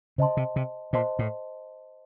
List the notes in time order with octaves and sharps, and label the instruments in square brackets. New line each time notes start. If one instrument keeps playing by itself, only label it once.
[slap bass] C#3 [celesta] C5 D#5 A5 C6
[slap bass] C3
C3
[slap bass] A#2 [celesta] C5 D#5 A5 C6
[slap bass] A2